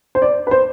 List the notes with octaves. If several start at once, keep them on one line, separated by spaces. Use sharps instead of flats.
C5
D5
B4
C5